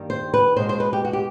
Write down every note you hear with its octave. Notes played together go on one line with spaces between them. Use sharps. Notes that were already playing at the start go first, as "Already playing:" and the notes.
Already playing: G2 D#3 G3 A#3
C5
B4
B2 G#3 B3 C5
C5
B4
G4
F#4
G4